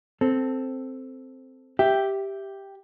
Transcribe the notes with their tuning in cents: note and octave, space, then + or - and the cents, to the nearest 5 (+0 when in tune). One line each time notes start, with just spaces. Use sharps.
C4 +0 A4 +0
G4 +0 E5 +0